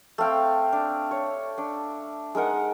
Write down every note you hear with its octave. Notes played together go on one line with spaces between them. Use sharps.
A3 C4 F5 G5
D4
C#5
D4
G#3 D#4 A#4 F#5